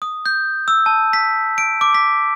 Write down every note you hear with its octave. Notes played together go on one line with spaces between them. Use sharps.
D#6
G6
E6
A5
B6
D7
D6
B6